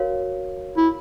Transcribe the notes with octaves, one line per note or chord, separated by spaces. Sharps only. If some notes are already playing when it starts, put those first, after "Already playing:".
Already playing: F#4 A#4 C#5 F5
E4